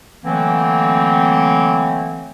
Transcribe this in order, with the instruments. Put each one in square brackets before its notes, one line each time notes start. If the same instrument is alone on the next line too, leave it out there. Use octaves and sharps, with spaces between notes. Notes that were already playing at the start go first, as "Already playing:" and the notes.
[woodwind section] D3 E3 F#3 A3 A#3 C4